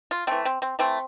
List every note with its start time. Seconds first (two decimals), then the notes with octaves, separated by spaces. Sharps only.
0.11 F4
0.27 E3 A3 C4
0.45 C4
0.62 C4
0.79 E3 A3 C4